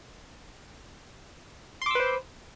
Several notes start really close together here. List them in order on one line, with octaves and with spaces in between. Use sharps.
C6 D6 E6 B4 C5